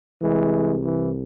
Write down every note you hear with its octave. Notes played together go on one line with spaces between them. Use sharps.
C2 C3 E3 G#3
E3